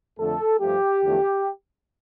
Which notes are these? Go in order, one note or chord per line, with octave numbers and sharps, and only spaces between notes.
F2 D3 A3 A4
G2 F3 A3 G4
E2 D3 F3 A3